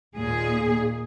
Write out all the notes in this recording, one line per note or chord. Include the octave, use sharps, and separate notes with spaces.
D#2 A#2 G#4